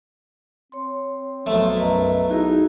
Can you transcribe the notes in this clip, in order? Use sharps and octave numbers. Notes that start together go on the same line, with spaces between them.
C4 C#5 C6
B1 F3 A3
F#2 B4 D#5 A#5
D#4 E4 F#4 G#4